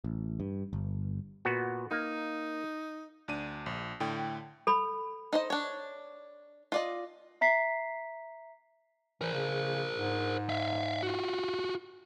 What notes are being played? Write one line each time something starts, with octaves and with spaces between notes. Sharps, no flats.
A1
G2
G1
A#2 B3 F#4
A#3 D#4
D2 D4 D#7
A#1
A2 D3 G5
A4 B5
D#4 C5 D#5
D4 C#5
F4 D5 D#5
E5 A#5 B6 C7
E3 A#4 C5
C#3
G#2
E5 F5
F4 F#4